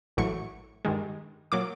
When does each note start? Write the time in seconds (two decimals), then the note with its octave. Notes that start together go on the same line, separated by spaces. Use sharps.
0.17 A1 A2 F#3 A3 C#6
0.85 G2 D#3 G#3
1.52 A#2 F#3 D6